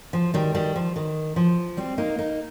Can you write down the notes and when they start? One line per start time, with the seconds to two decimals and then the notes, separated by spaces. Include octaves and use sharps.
0.13 F3
0.34 D#3 G3
0.55 D#3 G3
0.76 F3
0.96 D#3
1.36 F3
1.77 G3 C4
1.98 A#3 D#4
2.18 A#3 D#4